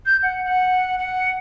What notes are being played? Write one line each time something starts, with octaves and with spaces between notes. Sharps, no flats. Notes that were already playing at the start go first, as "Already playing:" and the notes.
G6
F#5
F#5
F#5